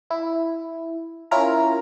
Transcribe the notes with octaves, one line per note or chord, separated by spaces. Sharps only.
E4
C#4 E4 F4 A#4 A#5